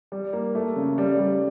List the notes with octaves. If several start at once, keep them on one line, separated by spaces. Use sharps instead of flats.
G3
A#3
A3
C#3
G3
G3